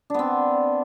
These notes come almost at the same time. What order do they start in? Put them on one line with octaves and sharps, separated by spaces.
D4 B3 C4